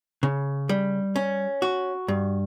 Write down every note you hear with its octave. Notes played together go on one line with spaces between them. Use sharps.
C#3
G3
C#4
F#4
G2